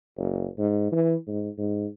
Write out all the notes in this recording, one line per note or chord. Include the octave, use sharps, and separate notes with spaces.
F#1
G#2
E3
G#2
G#2